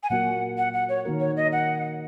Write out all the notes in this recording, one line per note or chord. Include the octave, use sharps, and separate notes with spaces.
G#5
A#2 F#3 A#3 F#4 F#5
F#5
F#5
C#5
D#3 A#3 F#4 A#4
C#5
D#5
F#5